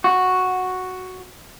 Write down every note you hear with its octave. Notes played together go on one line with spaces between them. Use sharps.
F#4